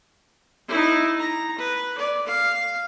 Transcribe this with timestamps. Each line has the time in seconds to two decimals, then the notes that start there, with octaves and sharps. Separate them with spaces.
0.68 D#4 E4
1.19 A#5
1.58 B4
1.98 D5
2.27 F5